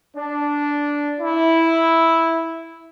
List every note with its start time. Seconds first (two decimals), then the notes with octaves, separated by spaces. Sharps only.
0.15 D4
1.20 E4